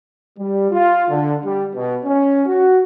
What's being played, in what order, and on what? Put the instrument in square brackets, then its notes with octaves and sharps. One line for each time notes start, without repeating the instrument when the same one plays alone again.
[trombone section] G3
F4
D3
G3
B2
C#4
F#4